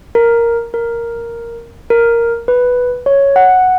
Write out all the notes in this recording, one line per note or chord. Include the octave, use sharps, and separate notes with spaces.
A#4
A#4
A#4
B4
C#5
F#5